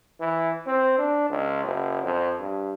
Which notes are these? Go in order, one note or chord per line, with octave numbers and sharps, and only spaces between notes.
E3
C4
D4
C#2
F#1
F2
G2